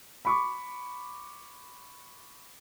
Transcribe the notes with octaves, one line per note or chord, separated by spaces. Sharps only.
B5 C#6 D6